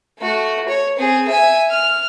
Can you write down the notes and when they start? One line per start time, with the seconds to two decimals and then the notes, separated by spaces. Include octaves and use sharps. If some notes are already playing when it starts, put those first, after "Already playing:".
0.20 A3 F#4
0.69 C#5
0.98 C4 G#4
1.28 E5 G#5
1.71 F6